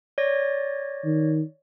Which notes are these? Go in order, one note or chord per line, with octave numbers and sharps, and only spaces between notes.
C#5 D5 A#6
D#3